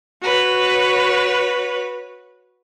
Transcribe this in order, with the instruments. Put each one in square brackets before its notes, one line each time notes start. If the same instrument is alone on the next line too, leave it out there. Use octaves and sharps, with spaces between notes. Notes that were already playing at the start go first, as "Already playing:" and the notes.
[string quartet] F#4 B4 C#5